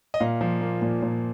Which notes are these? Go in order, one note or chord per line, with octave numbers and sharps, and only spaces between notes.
D#5
A#2 F5
F3
A#3
A#2
A#2